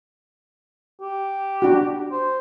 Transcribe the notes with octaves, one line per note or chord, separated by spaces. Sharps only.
G4
D4 F#4
C5